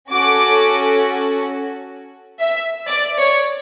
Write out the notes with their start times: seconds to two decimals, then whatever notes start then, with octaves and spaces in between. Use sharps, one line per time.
0.11 C#4 F#4 A4 D6
2.41 E5
2.87 D5
3.17 C#5